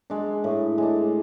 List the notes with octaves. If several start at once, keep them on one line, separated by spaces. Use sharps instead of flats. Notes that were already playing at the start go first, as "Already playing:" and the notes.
G#3 D4
A2
G#3 D4